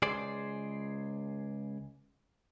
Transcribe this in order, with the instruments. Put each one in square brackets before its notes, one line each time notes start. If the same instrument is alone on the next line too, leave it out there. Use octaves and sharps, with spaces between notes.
[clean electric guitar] C#2 G#4 C5 D5